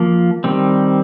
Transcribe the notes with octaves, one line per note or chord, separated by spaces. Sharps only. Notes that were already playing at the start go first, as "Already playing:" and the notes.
Already playing: F3 A#3
D#3 G3 C4